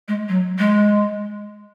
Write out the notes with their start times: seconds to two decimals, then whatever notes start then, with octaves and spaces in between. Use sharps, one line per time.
0.08 G#3
0.29 F#3
0.59 G#3